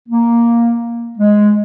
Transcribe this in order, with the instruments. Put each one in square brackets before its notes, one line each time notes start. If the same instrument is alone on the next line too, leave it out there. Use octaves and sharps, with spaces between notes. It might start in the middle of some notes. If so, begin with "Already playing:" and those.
[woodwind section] A#3
G#3